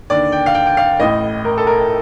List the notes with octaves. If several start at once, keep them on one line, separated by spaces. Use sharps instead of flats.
D#2 D3 D5
G5
F5
G5
G5
F5
A1 A2 D#5
A#4
A4
A#4